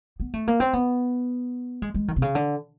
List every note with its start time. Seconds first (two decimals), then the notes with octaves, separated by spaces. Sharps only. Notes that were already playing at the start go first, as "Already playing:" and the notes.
0.20 B3
0.34 A3
0.48 A#3
0.60 C4
0.73 B3
1.82 G#3
1.94 G#3
2.08 D#3
2.16 C3
2.22 C#3
2.35 D3